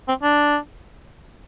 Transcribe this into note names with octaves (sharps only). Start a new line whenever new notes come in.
C4
D4